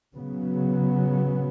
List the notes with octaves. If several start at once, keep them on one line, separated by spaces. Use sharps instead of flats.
C#3 F#3 B3